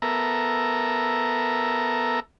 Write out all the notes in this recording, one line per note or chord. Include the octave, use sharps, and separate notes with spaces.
B3 A4 A#4 E5 A#5